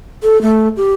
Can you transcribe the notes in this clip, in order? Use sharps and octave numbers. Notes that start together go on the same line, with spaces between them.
A4
A3
G4